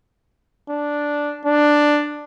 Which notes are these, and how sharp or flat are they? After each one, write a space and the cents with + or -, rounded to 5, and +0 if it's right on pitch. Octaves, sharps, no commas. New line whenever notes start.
D4 -5
D4 +5